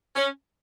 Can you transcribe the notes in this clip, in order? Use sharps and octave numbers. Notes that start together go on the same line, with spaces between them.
C#4